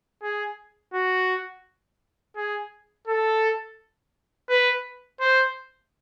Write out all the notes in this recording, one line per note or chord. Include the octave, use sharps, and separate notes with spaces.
G#4
F#4
G#4
A4
B4
C5